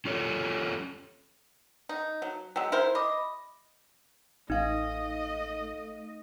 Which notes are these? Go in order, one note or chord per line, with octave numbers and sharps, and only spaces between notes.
C#4 F4 A4 C#5
D#4
F#3
F#3 G#3 G5 E6
E4 A#4 C5
D#5 B5 D6
A1 A3 D#4 D#5 F5